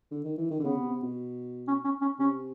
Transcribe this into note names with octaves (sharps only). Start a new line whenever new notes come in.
D3
D#3
E3
D#3
D3
C#3 B3
C3
C3
B2
C#4
C#4
C#4
C3 C#4